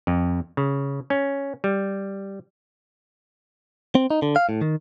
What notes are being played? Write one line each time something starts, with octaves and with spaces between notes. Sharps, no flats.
F2
C#3
C#4
G3
C4
D#4
D3
F5
A2
D#3